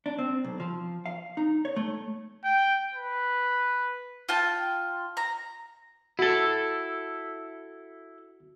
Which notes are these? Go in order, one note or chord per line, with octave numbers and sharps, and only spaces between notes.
D4
C4
B1
F3
F5
D#4
C#5
A3
G5
B4
F4 G5 A5
A#5
E4 F#4 A4